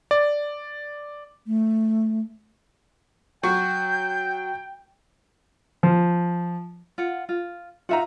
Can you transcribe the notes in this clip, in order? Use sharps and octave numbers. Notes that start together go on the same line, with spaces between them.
D5
A3
F#3 F#4 G5 C#6 G6
F3
F4 F#5
F4
D#4 F4 F#4 E5 F#5 A#5